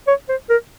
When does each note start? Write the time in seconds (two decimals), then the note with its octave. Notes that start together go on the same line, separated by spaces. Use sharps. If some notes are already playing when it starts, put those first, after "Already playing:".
0.07 C#5
0.29 C5
0.50 A#4